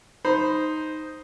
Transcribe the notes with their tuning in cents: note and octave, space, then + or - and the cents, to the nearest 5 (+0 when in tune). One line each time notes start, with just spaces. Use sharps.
D#4 +0 C5 +0 B5 +5